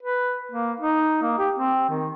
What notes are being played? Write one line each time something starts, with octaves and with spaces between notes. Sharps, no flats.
B4
A#3
D#4
A#3
G4
C4
D#3